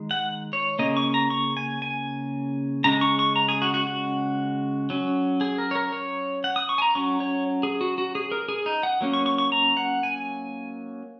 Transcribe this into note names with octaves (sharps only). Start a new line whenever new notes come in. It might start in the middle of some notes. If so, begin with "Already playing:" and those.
Already playing: D#3 G#3
F#5
C#5
C#3 A#3 C#4 D#5
C#6
A#5
C#6
G#5
G#5
C#3 G#3 C#4 A#5
C#6
C#6
A#5
G#4
F#4
F#4
F#4
F#3 C#4
G#4
A#4
C#5
A#4
C#5
F#5
D#6
C#6
G#5
A#5
F#3 C#4 C#6
C#5
G#4
F#4
F#4
G#4
A#4
G#4
D#4
F#5
F#3 A#3 C#4
C#6
C#6
C#6
A#5
F#5
G#5